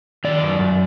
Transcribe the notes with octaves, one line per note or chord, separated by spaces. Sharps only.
D#3 D5
F#2
F#2